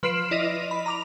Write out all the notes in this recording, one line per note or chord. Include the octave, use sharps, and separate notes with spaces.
F3 B4 F6 C7 D7 E7
E4 D5 D#5 A#6 D#7 F7
B5
A#5 D6 F7